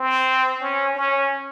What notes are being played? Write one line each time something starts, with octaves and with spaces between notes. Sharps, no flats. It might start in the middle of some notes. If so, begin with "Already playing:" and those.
Already playing: C4
C#4
C#4